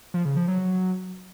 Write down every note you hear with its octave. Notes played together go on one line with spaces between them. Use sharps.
F3
C#3
F3
F#3